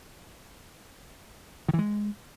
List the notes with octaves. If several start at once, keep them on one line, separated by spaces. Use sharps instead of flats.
D#3
E3
G#3